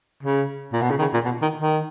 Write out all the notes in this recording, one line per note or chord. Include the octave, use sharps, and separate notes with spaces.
C#3
A#2
B2
C#3
D#3
C#3
A#2
B2
D#3
D#3